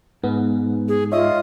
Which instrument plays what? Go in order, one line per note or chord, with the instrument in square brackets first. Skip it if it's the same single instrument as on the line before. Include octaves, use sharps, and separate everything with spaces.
[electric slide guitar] G#2 [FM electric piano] B3
[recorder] G#4
[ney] F4 [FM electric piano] C#5 E5 [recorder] D#5